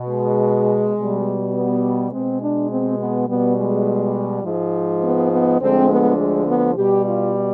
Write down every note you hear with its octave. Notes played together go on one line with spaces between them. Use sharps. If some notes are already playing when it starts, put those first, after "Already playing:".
Already playing: B2
G#3
B2 G3
B3
B2 G#3 C4
D4
C4
B3
B2 G3 B3
G#3
G#2 F3 G#3
B3
B3
D2 D3 F3 G#3 C4
B3
G#3
B3
B2 G3 G4
F4